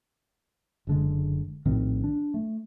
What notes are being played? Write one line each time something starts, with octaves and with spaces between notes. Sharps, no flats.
F#1 D3 G#3
A#1 A2 D#3 C4
D4
A3